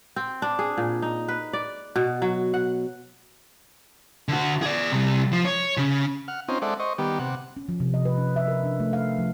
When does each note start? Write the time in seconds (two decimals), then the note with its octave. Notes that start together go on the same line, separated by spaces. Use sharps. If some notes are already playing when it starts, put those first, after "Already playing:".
0.16 C4
0.42 D4
0.59 G#4
0.77 A#2
1.02 D#4
1.28 B4
1.53 D5
1.96 B2
2.22 F#3
2.54 F#5
4.28 D3 F#4
4.62 G#4 D5
4.92 C3 G3
5.32 F3
5.45 C#5
5.77 C#3
6.28 F#5 F6
6.48 C4 C#4 D#4 F4 C5
6.62 G#3 A4 C5 D5 E5 F#5
6.80 C5 D#5 C#6
6.98 D#3 G3 B3 G4
7.19 C3 F#5
7.57 C#4
7.69 F3
7.80 C3
7.94 D#5
8.05 B4
8.18 C#4
8.36 E5
8.48 A#4
8.63 D4
8.80 A3
8.93 F5
9.19 F3